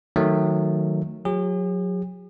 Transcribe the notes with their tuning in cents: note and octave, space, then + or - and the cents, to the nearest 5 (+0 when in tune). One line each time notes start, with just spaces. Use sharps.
D#3 +0 F#3 -15 A3 +0
F#3 -25 G#4 -45